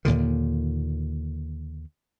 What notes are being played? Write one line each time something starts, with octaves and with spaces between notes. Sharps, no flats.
D#2 A#2 D3 D#3